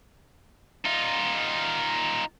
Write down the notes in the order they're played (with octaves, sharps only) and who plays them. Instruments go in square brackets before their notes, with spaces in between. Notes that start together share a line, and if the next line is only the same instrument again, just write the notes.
[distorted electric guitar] D#4 F4